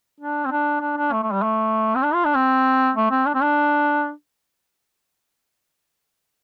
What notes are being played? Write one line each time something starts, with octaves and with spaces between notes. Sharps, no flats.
D4
C4
D4
D4
D4
A3
A3
G3
A3
C4
D4
F4
D4
C4
A3
C4
D4
C4
D4